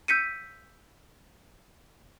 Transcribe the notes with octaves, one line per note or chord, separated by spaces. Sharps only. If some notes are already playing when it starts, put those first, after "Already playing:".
E6 G6 B6 C#7 D#7